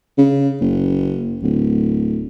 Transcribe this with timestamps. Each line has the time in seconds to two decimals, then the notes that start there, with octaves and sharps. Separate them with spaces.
0.18 C#3
0.61 F#1
1.43 D1